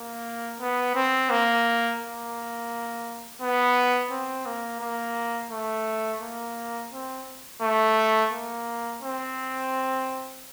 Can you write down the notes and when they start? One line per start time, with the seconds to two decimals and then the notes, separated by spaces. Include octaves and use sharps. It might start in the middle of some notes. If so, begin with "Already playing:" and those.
Already playing: A#3
0.60 B3
0.95 C4
1.30 A#3
2.00 A#3
3.41 B3
4.11 C4
4.46 A#3
4.81 A#3
5.51 A3
6.21 A#3
6.92 C4
7.62 A3
8.32 A#3
9.02 C4